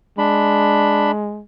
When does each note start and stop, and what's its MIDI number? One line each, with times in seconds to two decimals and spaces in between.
0.18 1.43 56
0.18 1.11 62
0.18 1.11 83